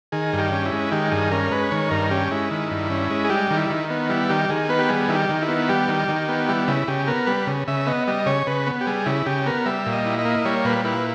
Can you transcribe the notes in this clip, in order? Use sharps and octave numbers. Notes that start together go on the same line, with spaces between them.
D#3 G#4
G2
G4
C#4
E4
G#3
D#3 G4
G2 G#4
C#4 A#4
G#3 B4
D#3 C#5
G2 A#4
C#4 G4
G#3 E4
D#3
G2
C#4
G#3
G#4
G3 G4
D#3
E4
D#3
B3
G3 E4
D#3 G4
D#3 G#4
B3 B4
G4
G3 G#4
D#3 E4
G4
D#3
E4
B3
G3 G4
D#3
D#3
B3
G3 E4
C#3 E4
C#3 G4
B3 A#4
G3 B4
C#3
C#3 E5
B3 D#5
G3 D#5
C#3 C#5
C#3 B4
B3
G4
G3 G#4
C#3 E4
C#3 G4
B3 A#4
G3 E5
A#2
D#5
E4
D#5
A#3
G3 C#5
A#2 B4
E4 B4